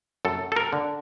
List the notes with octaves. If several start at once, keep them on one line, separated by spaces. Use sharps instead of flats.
F#2 A4
A4
A#4
D3